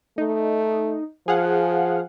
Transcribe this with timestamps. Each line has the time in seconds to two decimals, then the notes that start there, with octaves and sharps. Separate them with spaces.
0.18 A3 D#4
1.28 F3 G#4 F5 F#5